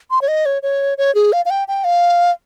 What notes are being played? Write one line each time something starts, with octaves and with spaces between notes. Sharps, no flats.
C6
C#5
D#5
C#5
C#5
C#5
G#4
F5
F5
G5
G5
F5